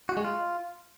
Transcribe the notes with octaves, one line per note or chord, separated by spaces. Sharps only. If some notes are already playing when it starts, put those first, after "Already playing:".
F#4
G#3
F4